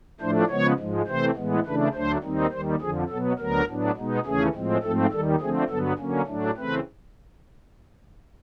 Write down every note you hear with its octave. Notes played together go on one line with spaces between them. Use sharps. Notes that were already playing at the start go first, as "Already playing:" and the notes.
A2 F3 A3 D4 C5
C#3 F3 G#3 B3 C#5
G#2 F3 G#3
C3 E3 A3 C4 C5
A2 E3 G#3 B3
C#3 E3 A3 D4 B4
D2 D3 F#3 A3 D4 C5
D#2 D#3 G3 C4 D#4
D#2 D#3 G3 C5
F2 D3 F3 G#4
B2 F#3 B3 A4
D2 D3 F#3 B3 A#4
A2 F#3 B3 D4
B2 G#3 B3 D#4
D#2 C#3 E3 A3 C#4 G#4
A2 F3 G#3 C4
G#2 F3 A3 C4 A4
D#2 D#3 G3 A4
D3 F3 A3 C4 G#4
G2 D3 F#3 B3 A4
D3 F#3 A#3 C#4
A2 F#3 A3 D4
C#3 E3 A3 C4 B4